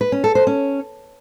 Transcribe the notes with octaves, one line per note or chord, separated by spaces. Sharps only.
B4
C#4
A4
C5
C#4